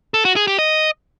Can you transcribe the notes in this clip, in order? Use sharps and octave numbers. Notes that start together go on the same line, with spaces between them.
A4
F#4
G#4
G4
D#5